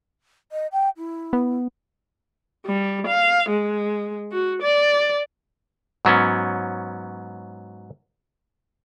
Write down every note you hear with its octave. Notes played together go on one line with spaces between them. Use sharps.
D#5
G5
E4
B3
G3
F5
G#3
F#4
D5
G#2 F#3 B3 C#4